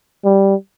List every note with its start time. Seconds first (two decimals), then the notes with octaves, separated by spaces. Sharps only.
0.25 G3